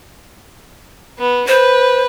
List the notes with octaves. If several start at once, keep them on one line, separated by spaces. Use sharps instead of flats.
B3
B4 C5